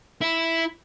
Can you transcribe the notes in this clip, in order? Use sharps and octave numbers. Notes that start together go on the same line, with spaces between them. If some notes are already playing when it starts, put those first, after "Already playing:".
E4